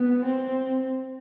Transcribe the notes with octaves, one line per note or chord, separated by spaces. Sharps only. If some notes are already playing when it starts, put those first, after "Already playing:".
Already playing: B3
C4